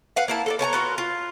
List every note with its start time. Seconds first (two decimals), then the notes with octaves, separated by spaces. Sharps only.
0.16 B4 F5 F#5
0.28 A#3 E4 A5
0.46 A4 A#4 D5
0.59 B3 C#5 A5 A#5
0.73 B3 F4 F#4 A#4
0.98 F4